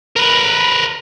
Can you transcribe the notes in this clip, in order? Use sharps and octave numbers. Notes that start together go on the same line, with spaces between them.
A#4 B4